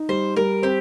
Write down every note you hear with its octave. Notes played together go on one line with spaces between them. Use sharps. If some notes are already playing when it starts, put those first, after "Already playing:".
Already playing: D#4
G3 C5
G3 A#4
C4 G4